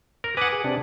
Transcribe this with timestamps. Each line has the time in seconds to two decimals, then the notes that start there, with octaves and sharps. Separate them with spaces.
0.24 A#4
0.37 B4 F#5 G#5 D6 D#6
0.52 G#4
0.64 C3 D4